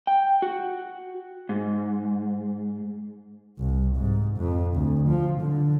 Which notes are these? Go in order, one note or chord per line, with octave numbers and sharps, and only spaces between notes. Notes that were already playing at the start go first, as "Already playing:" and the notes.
G5
F#4
G#2
C2
G#2
F2
D2
F3
D3